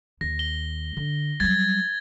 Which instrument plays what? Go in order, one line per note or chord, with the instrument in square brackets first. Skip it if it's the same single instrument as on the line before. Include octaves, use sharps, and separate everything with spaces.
[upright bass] D#2 [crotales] A#6
[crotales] G7
[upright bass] D3
[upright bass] F#3 G3 [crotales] G#6 A6